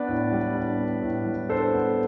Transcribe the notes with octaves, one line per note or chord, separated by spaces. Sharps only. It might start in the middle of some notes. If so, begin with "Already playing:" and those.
Already playing: B3 D4 B4 D5
A2
G3
D4
B3
A2
G3
D4 A4 C5
B3